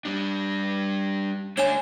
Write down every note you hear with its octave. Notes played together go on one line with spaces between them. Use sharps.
G3 D4
A3 D4 C#5 G#5 E7 G7